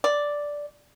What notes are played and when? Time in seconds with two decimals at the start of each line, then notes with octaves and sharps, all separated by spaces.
0.04 D5